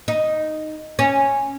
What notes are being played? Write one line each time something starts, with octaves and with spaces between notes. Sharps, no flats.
D#4
C#4